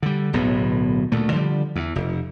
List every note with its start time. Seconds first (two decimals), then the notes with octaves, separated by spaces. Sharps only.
0.03 D3 G3
0.33 D1 B1 A2 B3
1.12 D2 A#2 A3
1.32 D3 F3 G3
1.76 E2
1.96 F1